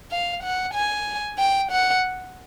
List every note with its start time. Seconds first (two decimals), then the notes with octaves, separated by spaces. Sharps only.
0.11 F5
0.43 F#5
0.74 G#5
1.39 G5
1.72 F#5